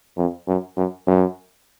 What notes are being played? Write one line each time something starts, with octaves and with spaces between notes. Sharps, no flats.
F2
F#2
F#2
F#2